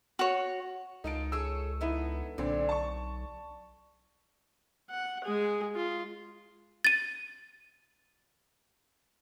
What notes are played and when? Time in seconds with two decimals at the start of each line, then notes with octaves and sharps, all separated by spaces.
0.19 F#4 C#5
1.04 C#2 D#4 F4 A4 A#4 D7
1.32 G#4 A4 C#5 E6
1.81 D3 B3 D#4 E4
2.38 B1 A#2 D3 C4 D5
2.69 A5 C#6
4.90 F#5
5.24 G#3 G#4
5.75 F4
6.85 A6 D#7